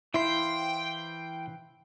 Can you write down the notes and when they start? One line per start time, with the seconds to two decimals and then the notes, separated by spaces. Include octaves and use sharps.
0.14 E3 E4 C5 F5 G5